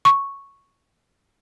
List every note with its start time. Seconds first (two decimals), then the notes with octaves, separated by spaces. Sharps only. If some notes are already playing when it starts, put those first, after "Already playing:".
0.05 C#6